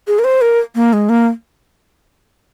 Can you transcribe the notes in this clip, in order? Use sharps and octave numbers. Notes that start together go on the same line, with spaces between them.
G#4
A#4
C5
A#4
A#3
G#3
A#3